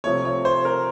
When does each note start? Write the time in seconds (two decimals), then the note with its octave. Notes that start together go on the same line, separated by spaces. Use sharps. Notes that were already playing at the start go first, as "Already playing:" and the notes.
0.04 C3 F3 A3 C#5
0.25 C#5
0.45 C5
0.65 A#4